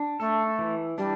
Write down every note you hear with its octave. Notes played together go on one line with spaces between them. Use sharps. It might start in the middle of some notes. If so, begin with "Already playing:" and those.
Already playing: D4
A3 A4
E3
G3 D4